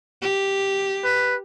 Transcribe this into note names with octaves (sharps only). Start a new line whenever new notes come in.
G4
B4